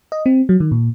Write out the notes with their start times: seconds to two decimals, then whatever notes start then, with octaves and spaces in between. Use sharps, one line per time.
0.12 D#5
0.26 C4
0.49 F#3
0.60 D#3
0.71 A#2